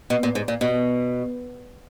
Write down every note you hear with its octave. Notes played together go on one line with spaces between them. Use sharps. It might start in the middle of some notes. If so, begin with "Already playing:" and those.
B2
A#2
G#2
A#2
B2